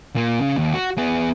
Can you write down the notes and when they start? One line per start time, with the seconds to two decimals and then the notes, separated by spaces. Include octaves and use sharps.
0.16 A#2 A#3
0.41 C#3
0.57 D#2
0.74 F#4
0.98 B3 G#4